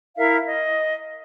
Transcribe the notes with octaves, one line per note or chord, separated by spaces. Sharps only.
E4 A#4 E5 F5
D#5